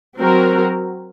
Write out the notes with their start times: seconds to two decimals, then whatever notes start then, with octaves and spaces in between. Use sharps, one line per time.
0.19 F#3 C4 F#4 A#4